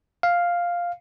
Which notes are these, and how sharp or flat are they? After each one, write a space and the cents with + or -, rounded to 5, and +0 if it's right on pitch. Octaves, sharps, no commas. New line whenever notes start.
F5 +0